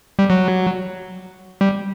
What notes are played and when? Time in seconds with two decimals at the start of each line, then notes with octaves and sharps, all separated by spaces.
0.19 G3
0.30 F#3
1.61 G3